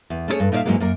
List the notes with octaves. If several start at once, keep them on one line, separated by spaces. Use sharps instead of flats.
E2
A3 C#4 E4 G4 G#4 C#5
G2
A#2 D#4 A4 D5 E5 F5
G#2 C3 E3 F#3 G#3 A#3
F#2 A#3 A#4